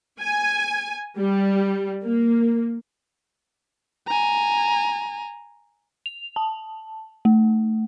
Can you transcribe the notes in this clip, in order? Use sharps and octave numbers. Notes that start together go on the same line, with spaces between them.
G#5
G3
A#3
G#5 A#5
F7
A5
A3